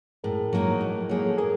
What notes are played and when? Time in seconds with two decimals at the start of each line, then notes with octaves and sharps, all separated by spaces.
0.24 A2 G#4 A#4
0.53 F#3 A#3 D#4
0.81 A2
1.09 F#3 A#3 D#4 G#4
1.24 A4
1.38 A#3 G#4 A#4